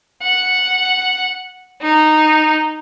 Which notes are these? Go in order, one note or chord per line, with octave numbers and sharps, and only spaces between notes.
F#5
D#4